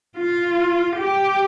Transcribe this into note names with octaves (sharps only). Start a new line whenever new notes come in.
F4
G4